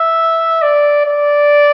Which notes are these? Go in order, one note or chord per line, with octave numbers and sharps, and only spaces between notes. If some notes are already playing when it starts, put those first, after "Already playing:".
Already playing: E5
D5
D5